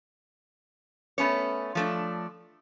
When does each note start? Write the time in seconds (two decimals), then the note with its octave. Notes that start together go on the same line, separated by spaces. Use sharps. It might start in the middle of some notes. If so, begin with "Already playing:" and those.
1.18 A3 B3 C#4 C#5
1.75 F3 A3 D4